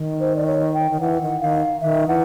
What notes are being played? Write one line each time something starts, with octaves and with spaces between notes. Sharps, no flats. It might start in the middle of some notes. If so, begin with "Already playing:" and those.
Already playing: D#3
C5
D5
C#5
G5
D#3
E3 F#5
D#3
D#3 F5
D#3 E5
E3 F#5